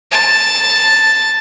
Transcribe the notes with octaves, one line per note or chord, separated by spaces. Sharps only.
A5